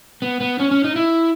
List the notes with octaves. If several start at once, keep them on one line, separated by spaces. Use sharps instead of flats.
B3
B3
C#4
C#4
D#4
E4